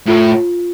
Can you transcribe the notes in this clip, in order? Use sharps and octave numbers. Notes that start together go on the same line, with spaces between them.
A2 F4